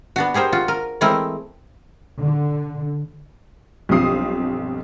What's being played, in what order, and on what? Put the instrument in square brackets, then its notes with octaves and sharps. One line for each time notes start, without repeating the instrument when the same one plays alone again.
[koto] B3 D4 F#4
G4 G#4 A#4 C5 G5
F4 F#4
A#4
E3 G#3 A3 C4 E4 A#4
[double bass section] D3
[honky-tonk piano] B1 G2 F3 C4 D#6 C7